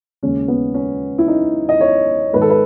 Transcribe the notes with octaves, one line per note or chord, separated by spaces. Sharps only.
D#2 C#3 G#3 C#4
B3
C#4
E4
D#4
D#5
C#5
G#2 D#3 G#3 B4
A4
B4